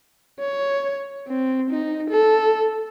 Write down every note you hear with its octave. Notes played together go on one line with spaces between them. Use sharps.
C#5
C4
D#4
A4